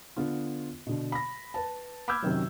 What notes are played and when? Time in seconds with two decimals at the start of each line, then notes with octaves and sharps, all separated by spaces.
0.17 D3 B3 F4
0.87 B2 D3
1.12 B5 A#6
1.54 B4 A5
2.08 B5 D6 E6 F6 G6 G#6
2.22 F#2 C3 D#3 F#3